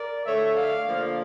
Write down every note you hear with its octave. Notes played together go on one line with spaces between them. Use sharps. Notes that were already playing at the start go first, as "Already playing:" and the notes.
Already playing: A#4 D5
D3 A3 C#5 E5
D5 F5
D3 F3 A#3